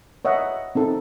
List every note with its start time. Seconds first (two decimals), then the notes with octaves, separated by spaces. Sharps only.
0.25 C#5 D#5 E5 F#5
0.75 C4 D#4 A4